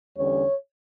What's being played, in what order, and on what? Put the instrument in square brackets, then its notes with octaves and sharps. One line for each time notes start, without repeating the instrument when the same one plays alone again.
[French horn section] E2 D3 G3 C#4 C#5